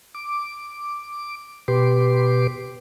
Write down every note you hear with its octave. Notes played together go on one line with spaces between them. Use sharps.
D6
B2 G4 B4 C6 D6